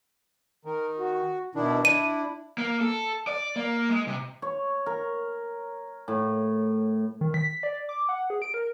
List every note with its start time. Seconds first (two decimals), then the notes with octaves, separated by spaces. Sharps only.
0.65 D#3 A#4
0.98 F#4
1.55 B2 D#3 D4 E4
1.85 D4 E4 D#7
2.58 A#3
2.81 A4
3.27 D5
3.56 A#3
3.89 G#3
4.07 C3
4.42 C#5
4.86 A#4
6.08 A2
7.21 D#3
7.34 B6
7.63 D5
7.89 D6
8.09 F#5
8.30 G#4
8.42 D7
8.54 A#4